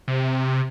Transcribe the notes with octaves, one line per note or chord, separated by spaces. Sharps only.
C3